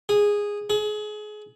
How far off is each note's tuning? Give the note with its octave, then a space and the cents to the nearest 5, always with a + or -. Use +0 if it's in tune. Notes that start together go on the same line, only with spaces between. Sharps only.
G#4 -10
G#4 +30